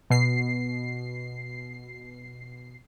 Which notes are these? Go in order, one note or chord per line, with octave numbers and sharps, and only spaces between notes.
B2 C7